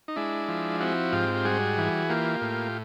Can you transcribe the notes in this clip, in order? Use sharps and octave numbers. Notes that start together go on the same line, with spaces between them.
D#4
G#3 D4 E4
F3
C4 E4 F#4
G#2 F4 G4
G4
G3 F#4 G#4
E3
A#3 F4 G4
A2